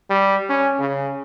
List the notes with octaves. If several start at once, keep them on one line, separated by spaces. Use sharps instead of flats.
G3
C#4
C#3